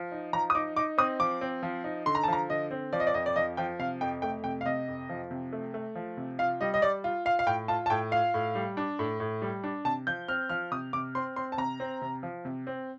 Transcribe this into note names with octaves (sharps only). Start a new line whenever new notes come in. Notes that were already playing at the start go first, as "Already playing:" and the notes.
Already playing: F3
D#4
F3 A#5
D#6
D#4 D6
D#4 D6
C4 D#6
F3 D6
C4
F3
D#4
D3 C6
A#5
A5
F3 A#5
D3 D#5
C4
F3 D5
D#5
D5
F2 D#5
D5
F3 D#5
F3 G5
C3 F5
F2 G5
A3 G5
C3 G5
F5
C3 D#5
F2
F3
C3
A3
A3
F3
C3
F4 F5
G3 D#5
D#5
G3 D5
F4
F4 F5
F5
A2 G5
F4 A5
A5
A2 G5
F4 F5
A2
G3
D4
A2
A2
G3
D4
C3 A5
F3 G6
C4 F6
F3 F6
C3 D#6
C3 D6
C4 C6
C4 C6
A5
C3 A#5
C4
C3
F3
C3
C4